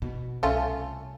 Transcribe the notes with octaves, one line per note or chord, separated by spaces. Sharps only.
B2
C2 A3 C#4 F4